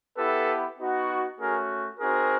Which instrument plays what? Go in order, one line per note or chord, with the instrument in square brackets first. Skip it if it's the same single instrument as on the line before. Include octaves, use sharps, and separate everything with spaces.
[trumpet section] B3 E4 G4 A4 B4
B3 D#4 F#4
A3 C#4 F#4 G#4 A#4
C4 D#4 F#4 G#4 A#4